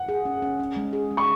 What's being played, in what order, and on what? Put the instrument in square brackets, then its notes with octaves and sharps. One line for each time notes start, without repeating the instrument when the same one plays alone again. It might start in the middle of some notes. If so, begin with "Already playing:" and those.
Already playing: [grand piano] F#5
[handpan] G#4
C#4
C#4
C#4
G#3
G#4
G#3
[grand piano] C#6